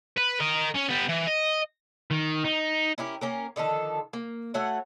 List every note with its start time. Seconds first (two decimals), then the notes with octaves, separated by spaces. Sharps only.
0.17 B4
0.40 A#4 D#5
0.74 C#4
0.89 G3 B3
1.09 E3
1.27 D#5
2.11 D#3
2.44 D#4
2.98 C#4 E4 G4 A#4
3.21 A#3 C#4 A#4
3.56 D3 D#3 F3 A4
4.13 A#3
4.54 A3 F#4 C#5 F#5